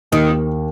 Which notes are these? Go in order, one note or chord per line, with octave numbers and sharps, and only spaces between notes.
D#2 D#3
A#3